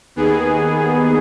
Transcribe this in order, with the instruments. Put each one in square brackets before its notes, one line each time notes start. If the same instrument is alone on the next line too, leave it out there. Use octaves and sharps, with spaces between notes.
[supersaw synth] D#2 D#3 B3 G#4